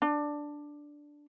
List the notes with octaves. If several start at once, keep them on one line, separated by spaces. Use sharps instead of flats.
D4